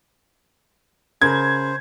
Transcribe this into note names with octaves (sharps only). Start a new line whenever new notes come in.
C#3 A#4 C5 G#6